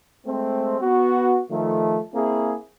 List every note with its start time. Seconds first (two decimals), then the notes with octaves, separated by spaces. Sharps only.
0.26 G#3 A3 C4
0.81 B3 F#4
1.51 D#3 F3 A3
2.14 A#3 C4 E4 G#4